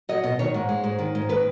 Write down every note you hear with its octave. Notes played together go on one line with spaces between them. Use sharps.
F#3 D#5
B2 D#5
D#3 C#5
G#2
G#3
G#2
D#3
G#2
D#3 B4